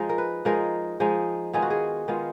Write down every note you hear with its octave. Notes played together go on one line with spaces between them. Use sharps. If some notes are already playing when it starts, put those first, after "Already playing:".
Already playing: F3 G#3 D#4 D#5
A#4
B4
F3 G#3 D#4 A#4
F3 G#3 D#4
D#3 G#3 B3 F4 G#4
F#4
G#4
D#3 G#3 B3 F4